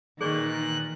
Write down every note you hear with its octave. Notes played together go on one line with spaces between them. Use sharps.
A#2 D#3 E3 G#4 D5 C#6 F#6